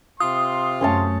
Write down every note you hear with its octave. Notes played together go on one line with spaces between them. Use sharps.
C3 F4 C6 D#6
F#2 A3 C#4 C#5 A5